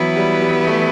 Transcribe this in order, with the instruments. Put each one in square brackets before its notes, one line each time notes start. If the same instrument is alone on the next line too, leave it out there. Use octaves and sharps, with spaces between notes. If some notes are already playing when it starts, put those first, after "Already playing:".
Already playing: [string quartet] E3 B3 E4 [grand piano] F#3
[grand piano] G3
G3
A3